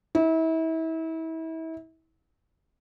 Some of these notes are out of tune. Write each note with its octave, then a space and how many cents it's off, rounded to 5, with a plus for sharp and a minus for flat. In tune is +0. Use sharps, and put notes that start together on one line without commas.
E4 -35